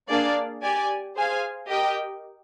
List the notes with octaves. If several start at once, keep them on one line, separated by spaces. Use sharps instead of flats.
A#3 D4 G#4 D5 F5
G4 D5 G#5
G#4 C5 F5 G#5
G4 A#4 D#5 G5